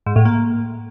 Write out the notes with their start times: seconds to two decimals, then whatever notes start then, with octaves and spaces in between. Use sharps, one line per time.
0.06 G#2
0.16 A2
0.25 A#3